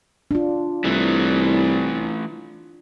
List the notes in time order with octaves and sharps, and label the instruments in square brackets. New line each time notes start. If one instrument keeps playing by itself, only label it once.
[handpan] D4 F4
[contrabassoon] C2 [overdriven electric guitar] E3 A3